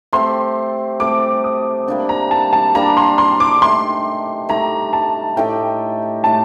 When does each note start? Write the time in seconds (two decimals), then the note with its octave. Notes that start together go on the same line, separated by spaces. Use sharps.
0.13 A3 C4 G4 C6
1.00 A3 C4 G4 D6
1.44 D#6
1.88 G3 A#3 D4 G4
2.09 A#5
2.31 A5
2.53 A5
2.75 G3 A#3 D4 G4 A#5
2.97 C6
3.18 C6
3.40 D6
3.62 A3 D#4 G4 C6
4.49 A3 D#4 G4 A#5
4.93 A5
5.37 A2 A3 D#4 G4 G5
6.24 A2 A3 D#4 G4 A5